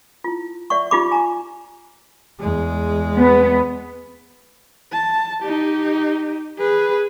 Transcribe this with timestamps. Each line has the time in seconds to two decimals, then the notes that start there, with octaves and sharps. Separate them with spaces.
0.24 E4 F4
0.70 D5 E5 F#5 C#6
0.91 D#4 F4 G4 B5 D6
1.11 G#5 A#5
2.40 E2 G#3
3.17 B3
4.93 A5
5.43 D#4 G4
6.59 G#4 B4